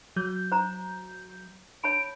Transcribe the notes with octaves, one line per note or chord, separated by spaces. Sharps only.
F#3 G6
C5 A#5
C#5 A5 B5 D7